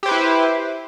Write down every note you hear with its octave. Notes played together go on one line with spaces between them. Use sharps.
E4 G4 B4 C5